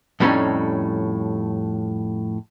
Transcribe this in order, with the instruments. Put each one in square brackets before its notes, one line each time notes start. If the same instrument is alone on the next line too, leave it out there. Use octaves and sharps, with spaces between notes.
[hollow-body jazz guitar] F2 A2 G3 G#3 C#4 D#4